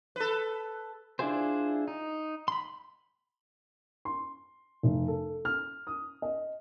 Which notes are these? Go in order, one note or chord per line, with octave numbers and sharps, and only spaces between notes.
A4 B4
D4 E4 F4 G#4 C5
D#4
B5 C6
C6
F1
A4
F6
D#6
D#5